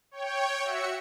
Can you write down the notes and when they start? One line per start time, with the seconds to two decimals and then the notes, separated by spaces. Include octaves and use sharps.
0.11 C#5 G5
0.63 F#4 E5 C#7